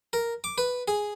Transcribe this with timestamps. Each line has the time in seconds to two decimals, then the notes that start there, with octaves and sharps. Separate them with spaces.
0.13 A#4
0.44 D6
0.58 B4
0.88 G#4